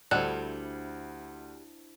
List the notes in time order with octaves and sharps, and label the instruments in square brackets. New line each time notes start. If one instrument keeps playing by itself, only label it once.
[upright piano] D2 [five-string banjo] G3 A4 [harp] D4 E4 C5 [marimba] F#6